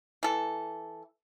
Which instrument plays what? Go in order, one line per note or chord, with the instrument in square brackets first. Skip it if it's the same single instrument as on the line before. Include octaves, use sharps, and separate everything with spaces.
[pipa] E3 A4